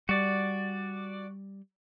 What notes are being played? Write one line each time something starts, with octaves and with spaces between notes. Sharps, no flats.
G3 F#4 D5